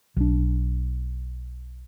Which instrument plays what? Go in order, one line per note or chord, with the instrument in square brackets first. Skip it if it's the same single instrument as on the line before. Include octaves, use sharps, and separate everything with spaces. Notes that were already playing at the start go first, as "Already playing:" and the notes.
[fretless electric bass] B1 D4